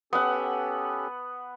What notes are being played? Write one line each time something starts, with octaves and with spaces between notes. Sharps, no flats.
B3 C#4 G4 A4 F#5